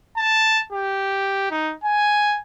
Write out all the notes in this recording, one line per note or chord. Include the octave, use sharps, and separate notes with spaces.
A5
G4
D#4
G#5